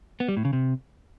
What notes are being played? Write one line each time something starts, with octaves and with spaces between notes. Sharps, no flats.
B3
G3
A2
C#3
C3